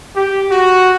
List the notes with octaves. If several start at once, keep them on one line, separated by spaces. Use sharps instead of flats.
G4
F#4